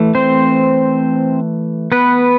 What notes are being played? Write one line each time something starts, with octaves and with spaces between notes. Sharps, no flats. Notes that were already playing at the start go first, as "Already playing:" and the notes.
Already playing: E3 A3
C4 C5
B3 B4